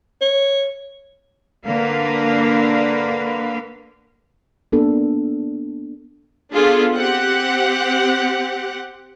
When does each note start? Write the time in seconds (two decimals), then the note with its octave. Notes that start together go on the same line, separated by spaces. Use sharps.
0.21 C#5
1.67 D3 A#3 D4 B4 F5
4.72 A#3 B3 D4 A4
6.53 B3 D4 F4 G#4 A4
6.96 C4 G4 F#5